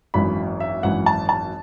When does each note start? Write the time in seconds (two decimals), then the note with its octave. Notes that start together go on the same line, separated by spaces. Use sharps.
0.14 G#1 F#2 E3 B5
0.60 E5
0.83 G#1 F#2 E3 F#5
1.06 A5
1.29 A5